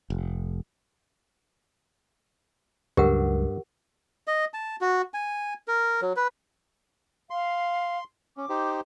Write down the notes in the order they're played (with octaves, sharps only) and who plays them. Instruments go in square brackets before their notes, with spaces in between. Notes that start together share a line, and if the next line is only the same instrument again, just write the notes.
[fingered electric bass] F1
[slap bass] C#2 F#3 [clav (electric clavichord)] G2 [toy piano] G4 A#4 F#5
[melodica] D#5
A5
F#4
G#5
A#4
F#3
B4
[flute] F5 [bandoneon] C6
[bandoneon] C#4 [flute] D6
[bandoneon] D#4 G4 C5